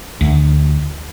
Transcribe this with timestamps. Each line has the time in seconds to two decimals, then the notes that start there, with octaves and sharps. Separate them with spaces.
0.21 D2